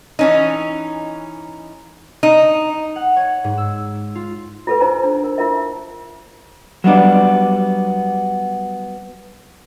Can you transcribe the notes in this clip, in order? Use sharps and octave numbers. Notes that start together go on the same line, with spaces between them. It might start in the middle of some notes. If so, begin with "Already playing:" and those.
E3 C#4 D#4
D#4
F#5
C#5
G#2
E6
F4
F4 A4 B4
D#4 C5 G#5 A#5
D4
A#4
E4 F4 A#4 E5
F#3 G3 B3 D4